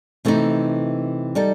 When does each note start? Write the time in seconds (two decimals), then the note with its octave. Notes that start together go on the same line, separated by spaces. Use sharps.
0.25 C3 E3 A3 D#4
1.35 G3 D#4 A4